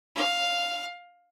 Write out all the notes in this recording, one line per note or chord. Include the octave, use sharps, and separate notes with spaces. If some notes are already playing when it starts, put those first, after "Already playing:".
F5